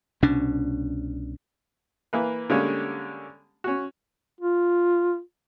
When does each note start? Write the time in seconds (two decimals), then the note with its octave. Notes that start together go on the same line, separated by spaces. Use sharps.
0.22 C2 B2 C#4 D4
2.13 E3 A#3 B4
2.50 D3 G3 G#3 A#3 C#4
3.64 C#4 F#4
4.40 F4